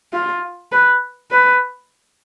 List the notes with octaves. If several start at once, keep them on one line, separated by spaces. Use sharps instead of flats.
F4
B4
B4